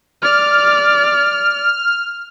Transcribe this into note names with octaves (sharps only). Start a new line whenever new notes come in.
D5 F6